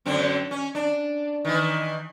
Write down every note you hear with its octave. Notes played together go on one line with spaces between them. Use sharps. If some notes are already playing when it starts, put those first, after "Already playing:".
F#2 D3 C4
C#4
D4
D#3 E3